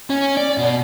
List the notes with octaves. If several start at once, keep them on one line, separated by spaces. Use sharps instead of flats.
C#4
D5
B2